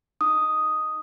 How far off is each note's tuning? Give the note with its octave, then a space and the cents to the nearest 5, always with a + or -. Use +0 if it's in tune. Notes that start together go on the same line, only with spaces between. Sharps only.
D#4 +0 D#6 +0